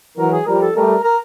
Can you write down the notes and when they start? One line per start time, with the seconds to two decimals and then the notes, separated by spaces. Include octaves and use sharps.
0.18 E3 F#3 A#4
0.32 G#4
0.46 F3 G3 A#4
0.61 A4
0.75 G3 A3 A#4
1.04 A#4